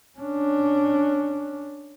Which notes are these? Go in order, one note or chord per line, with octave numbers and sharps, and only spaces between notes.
C#4 D4